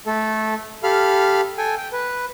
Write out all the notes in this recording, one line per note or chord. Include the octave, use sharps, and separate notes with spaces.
A3 A4
G4 A4 F5 B5 F6
A4 G5 G#5
G5
B4